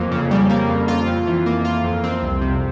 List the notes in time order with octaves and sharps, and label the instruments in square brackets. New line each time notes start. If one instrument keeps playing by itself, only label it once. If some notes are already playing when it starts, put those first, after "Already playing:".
Already playing: [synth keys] F2 A#3
C#3
G3
A#3
F2
F4
F2
E3
A#3
F4
F2
C4
C2
C3